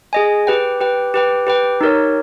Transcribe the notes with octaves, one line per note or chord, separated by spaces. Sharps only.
G#4 D#5 G#5
G4 B4 G5
G4 B4 G5
G4 B4 G5
G4 B4 G5
D#4 G4 A#4 C#5